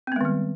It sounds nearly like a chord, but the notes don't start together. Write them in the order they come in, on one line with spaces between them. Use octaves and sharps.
C4 B3 G#3 D#3 G3